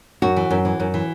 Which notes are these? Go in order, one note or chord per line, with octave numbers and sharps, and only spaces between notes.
F#2 F#4
E3
F#2
E3
F#2
E3